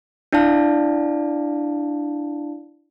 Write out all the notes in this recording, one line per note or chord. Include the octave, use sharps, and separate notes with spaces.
D4 E4 D5 F5 A5